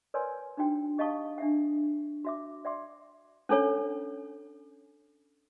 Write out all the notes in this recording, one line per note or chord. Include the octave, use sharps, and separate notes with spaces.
A#4 B4 C#5 D5 G#5 C6
D4 D#4 F#4 G5
G4 D#5 F5 A5 C#6 D#6
D4 E5 F#5
F#4 E5 D6
D5 E5 F#5 C6 D6
C#4 D4 A4 C#5